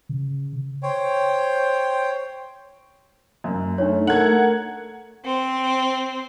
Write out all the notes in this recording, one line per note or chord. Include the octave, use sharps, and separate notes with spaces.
C#3
C5 C#5 G5
F#2
A3 D4 D#4 C#5
A3 A4 A#4 F#5 G#6 F#7
C4